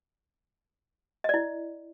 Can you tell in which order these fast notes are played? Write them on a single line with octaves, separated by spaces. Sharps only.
D#5 D5 E4